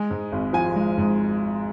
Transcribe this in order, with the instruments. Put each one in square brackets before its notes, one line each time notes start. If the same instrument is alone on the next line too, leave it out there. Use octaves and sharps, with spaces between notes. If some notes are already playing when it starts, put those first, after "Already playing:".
Already playing: [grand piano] G#3 G#5
G#2
G#1
F3 G#5
G#3
G#2